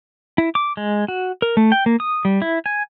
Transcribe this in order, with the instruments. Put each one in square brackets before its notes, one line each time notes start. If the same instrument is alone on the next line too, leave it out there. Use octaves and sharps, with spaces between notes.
[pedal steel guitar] E4
D6
G#3
F#4
A#4
A3
G5
A#3
D#6
G3
E4
G#5